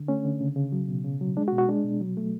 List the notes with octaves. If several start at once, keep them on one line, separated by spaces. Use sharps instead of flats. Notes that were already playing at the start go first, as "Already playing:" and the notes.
Already playing: D3
A3 C#4
D3
C#3
C#3
F#3
B2
C#3
F#3
G#3 D4
F#4
B2
F#4
G#3 D4
B2
F#3
A3